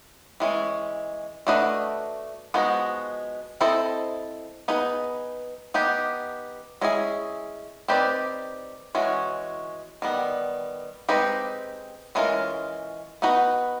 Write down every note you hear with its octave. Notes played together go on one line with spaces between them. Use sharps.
E3 G#3 C#4
A3 D4 F#4 B4 D#5
F3 G#3 B3 D#4 F#4
C4 E4 A4 C5 D#5
B3 D#4 G#4 B4
B3 D#4 G4
G#3 C#4 E4 G#4
C4 D#4 G4 B4 D5
E3 G#3 C#4 F#4
D#3 G3 B3
G#3 C4 D#4 G4 B4
E3 G#3 C#4 F4 A#4
B3 D#4 F#4 B4